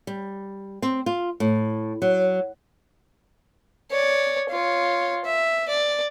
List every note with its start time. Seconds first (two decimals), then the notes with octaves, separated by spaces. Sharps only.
0.07 G3
0.82 C4
1.06 F4
1.40 A2
2.02 F#3
3.91 C#5 D5
4.49 F4 C#5
5.25 E5
5.68 D5